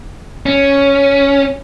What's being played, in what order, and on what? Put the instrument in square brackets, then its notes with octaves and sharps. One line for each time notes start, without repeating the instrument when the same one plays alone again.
[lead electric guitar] C#4